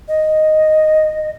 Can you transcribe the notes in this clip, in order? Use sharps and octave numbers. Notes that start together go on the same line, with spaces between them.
D#5